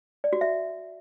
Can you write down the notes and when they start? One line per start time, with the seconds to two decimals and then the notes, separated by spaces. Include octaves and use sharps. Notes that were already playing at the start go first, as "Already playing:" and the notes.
0.24 D5
0.33 F#4
0.41 E5